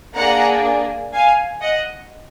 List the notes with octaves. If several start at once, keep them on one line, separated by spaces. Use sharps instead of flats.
A#3 D4 G#4 F#5 A#5
F5 G#5
D#5 F#5